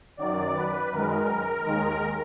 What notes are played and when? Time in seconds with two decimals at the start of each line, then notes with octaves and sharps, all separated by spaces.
0.17 F#2 D#3 F#3 D5
0.54 B4
0.91 F#2 D#3 G#3 A#4
1.63 D#2 D#3 G#3